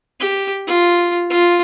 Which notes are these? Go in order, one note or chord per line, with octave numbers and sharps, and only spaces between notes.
G4
F4
F4